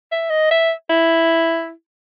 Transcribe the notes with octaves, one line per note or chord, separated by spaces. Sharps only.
E5
D#5
E5
E4